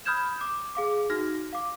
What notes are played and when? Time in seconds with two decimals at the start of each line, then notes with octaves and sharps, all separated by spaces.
0.05 B5 D#6 F6 G6 G#6 E7
0.41 D6
0.75 G#4 F5 D6
1.10 D#4 F#4 F6 A#6
1.53 F5 D6